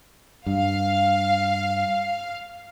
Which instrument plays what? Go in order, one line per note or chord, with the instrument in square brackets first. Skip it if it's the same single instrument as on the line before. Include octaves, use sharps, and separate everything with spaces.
[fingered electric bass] G2 [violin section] F5